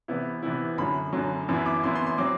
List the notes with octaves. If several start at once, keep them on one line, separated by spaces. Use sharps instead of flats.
C3 E3 B3 E4
C3 E3 B3 E4
F#2 D3 F#3 B5
F#2 D3 F#3
F#2 E3 B3 E4
D6
F#2 E3 B3 E4 C6
C6
C6
F#3 C4 D6